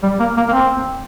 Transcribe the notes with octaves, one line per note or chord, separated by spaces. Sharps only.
G3
A#3
A#3
A#3
C4